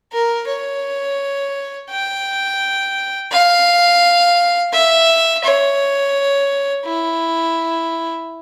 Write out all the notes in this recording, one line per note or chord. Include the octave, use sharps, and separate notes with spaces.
A#4
C#5
G5
F5
E5
C#5
E4